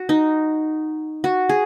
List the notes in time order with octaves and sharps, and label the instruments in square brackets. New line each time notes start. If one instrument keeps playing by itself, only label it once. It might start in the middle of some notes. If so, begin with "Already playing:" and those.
Already playing: [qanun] F#4
D#4
F#4
G#4